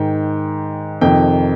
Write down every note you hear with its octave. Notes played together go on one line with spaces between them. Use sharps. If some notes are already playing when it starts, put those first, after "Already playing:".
Already playing: G#2 D#3 G5
F2 C3 D#3 G5